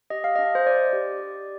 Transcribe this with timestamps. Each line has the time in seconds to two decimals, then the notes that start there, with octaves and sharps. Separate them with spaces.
0.10 G4 D#5
0.24 F5
0.36 D4 D#5
0.55 C5
0.66 D4 D5
0.93 G4
1.20 G4